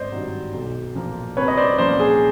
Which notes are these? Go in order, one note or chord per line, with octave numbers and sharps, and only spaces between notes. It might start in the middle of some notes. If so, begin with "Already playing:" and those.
Already playing: G#1 C5 D5 D#5
G2 D#3 F#3
B1
A#2 F3 A#3
C2 B4 C#5
D#5
C5 D5
A#2 F3 A#3 C#4 C5 D5
G#4